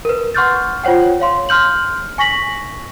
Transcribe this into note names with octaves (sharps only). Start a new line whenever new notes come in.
A#4 B4
F#5 C6 C#6 F6 G6 A6
F4 C5 C#5 F#5 G5
C#5 F5 C6
C6 F6 G6 F#7
G#5 C#6 A#6 B6 F#7